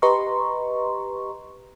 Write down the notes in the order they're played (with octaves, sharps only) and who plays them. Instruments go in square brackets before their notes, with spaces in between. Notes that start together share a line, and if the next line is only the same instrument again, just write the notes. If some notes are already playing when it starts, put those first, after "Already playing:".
[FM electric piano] G4 B4 D#5 A#5 C6 C#6